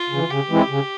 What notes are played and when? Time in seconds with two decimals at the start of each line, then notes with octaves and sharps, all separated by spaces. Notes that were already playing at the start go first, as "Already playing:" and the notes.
Already playing: F4
0.10 C#3 E3
0.30 C#3 G4
0.49 E3 G#3 C4 E4
0.70 C#3